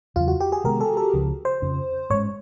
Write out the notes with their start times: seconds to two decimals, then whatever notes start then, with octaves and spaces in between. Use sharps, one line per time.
0.16 E2 C#3 F#3 F4
0.28 F#4
0.40 G4
0.52 G#4
0.64 C3 D#3 G#3 B3 A#4
0.81 A4
0.97 A4
1.14 C#2 C#3 F3
1.45 C5
1.62 F2 C#3 F3
2.10 G#2 E3 G#3 C#4 C#5